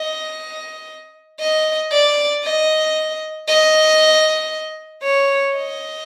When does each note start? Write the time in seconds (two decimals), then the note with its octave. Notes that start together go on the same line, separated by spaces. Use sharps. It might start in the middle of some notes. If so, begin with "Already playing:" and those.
Already playing: D#5
1.40 D#5
1.92 D5
2.44 D#5
3.48 D#5
5.03 C#5
5.55 D#5